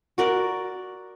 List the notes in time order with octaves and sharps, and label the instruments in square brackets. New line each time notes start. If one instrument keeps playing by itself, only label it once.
[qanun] F#4 A#4 D5